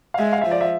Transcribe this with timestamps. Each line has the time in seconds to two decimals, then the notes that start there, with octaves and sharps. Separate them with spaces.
0.14 F5
0.19 G#3 E5
0.33 F5
0.41 E5
0.47 F3 D5
0.61 E5